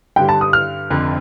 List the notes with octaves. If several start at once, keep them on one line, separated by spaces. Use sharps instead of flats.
G2 D3 G3 G5
A5
D#6
F6
F1 F2 D3